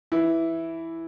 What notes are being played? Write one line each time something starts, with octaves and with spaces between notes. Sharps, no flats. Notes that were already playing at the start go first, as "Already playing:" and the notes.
E3 E4